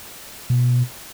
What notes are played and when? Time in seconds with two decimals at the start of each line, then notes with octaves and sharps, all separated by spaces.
0.50 B2